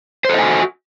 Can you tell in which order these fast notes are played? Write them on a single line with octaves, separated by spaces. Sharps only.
C5 A4 D#5 G#5 F#4